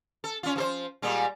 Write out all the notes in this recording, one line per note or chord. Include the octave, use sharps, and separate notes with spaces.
A4
C#4 F4
F3 A4 C5
A#2 G3 G#3